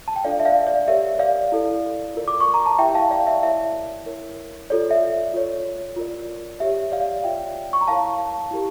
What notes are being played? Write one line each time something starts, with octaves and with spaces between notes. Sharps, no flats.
A5
G5
D4 F4 A4 D5 F5
E5
D5 F5
D5
G4 A#4 C#5 E5
D5 F5
E4 A4 D5
F4 A#4 D5
D6
C#6
A#5
A5
E4 G4 A#4 E5 G5
F5 A5
D5 F5
E5
E4 A#4 C#5 E5
E4 A#4 C#5
F4 A4 C#5 D5
E5
F4 C#5
F4 A#4 D5
G4 C#5 E5
D5 F5
F4 C#5 E5 G5
C#6
A#5
E4 A#4 C#5 F5 A5
E4 G4 A#4